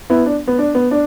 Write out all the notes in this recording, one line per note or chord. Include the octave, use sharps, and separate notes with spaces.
B3 E4
D4
B3
D4
B3
D4